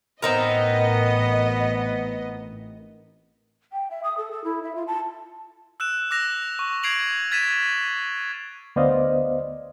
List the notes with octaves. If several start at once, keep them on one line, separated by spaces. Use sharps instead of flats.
A1 B3 C4 D#4 A#4 D#5
G5
E5
D#6
A4
A4
E4
E5
F4
A5
E6 F#6 E7
D6 E6 F#6 A#6 F7
C#6
G#6 C7 D7 F7 F#7
F6 G#6 A6 B6 D#7 E7
D2 B3 C5 D5 D#5 F5